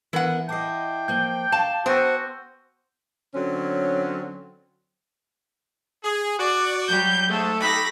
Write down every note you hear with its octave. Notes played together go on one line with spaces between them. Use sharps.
E3 B3 A#4 F#5
E4 D#5 G5 A5 D6 C7
F3 A#3 G6 G7
F5 A5
B3 F#4 C5 G5 G#5 C6 E6
D3 F#3 C4 C#4
G#4
F#4 D5
F#3 G3 G4 G6
G#2 G#3 A3 A4
D#4 F#4 G4 B5 A#6